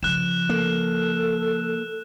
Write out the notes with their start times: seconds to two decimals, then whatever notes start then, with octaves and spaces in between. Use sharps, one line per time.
0.03 C#3 F3 F#6 E7
0.49 A#3 A4